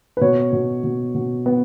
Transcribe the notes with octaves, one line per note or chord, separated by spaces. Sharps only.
B4
B2 C#5
B2
B2
B2
B3